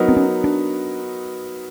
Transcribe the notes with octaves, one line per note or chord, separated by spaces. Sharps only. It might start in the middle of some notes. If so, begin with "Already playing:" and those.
Already playing: F#3 B3 D#4 F#4 A#4
C4
C#4
D4